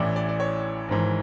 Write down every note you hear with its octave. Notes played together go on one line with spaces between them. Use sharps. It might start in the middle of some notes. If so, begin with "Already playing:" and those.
Already playing: A1 A2 E3 D5
D5
D5
C#5
G#1 G#2 E3